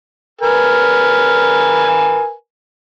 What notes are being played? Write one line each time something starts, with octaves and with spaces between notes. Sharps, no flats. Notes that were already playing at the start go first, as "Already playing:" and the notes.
A#4 B4 G#5